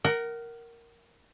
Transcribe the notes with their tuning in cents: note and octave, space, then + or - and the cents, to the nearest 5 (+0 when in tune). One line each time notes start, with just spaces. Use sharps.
A#4 +0 F#5 +30